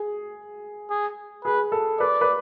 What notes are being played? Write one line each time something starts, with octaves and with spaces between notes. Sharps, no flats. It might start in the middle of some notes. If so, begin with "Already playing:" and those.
Already playing: G#4
G#4
G#4 B4
A4
B4 D5
B4